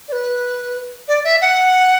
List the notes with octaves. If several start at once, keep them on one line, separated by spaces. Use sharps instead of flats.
D5
B4
D5
E5
F#5